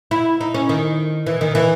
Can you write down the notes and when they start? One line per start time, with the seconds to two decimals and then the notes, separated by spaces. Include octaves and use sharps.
0.11 E4
0.41 D#4
0.54 C#4
0.69 D#3
1.27 E3
1.41 D#3
1.55 E3